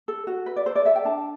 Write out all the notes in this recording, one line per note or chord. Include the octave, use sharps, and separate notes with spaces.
A4
F#4
B4
D5
A4 C5
D5
A4 E5
G5
D4 A5